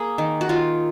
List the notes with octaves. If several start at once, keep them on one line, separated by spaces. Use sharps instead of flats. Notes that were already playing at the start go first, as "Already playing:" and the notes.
Already playing: A#3 G#4
D#3
F#4
D#3 F4